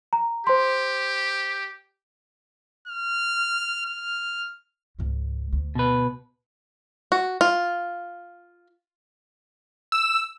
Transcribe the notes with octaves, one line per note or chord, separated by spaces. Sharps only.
A#5
G4 C5 C6
F6
F6
C#2 G#2
D2
B2 B4
F#4
F4
E6